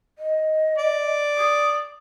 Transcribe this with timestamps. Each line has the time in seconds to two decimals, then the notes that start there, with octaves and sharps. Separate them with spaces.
0.19 D#5
0.78 D5
1.38 D#6